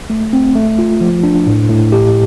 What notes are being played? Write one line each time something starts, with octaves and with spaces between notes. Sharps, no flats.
A3
C4
A3
F4
F3
D4
A2
A2
G4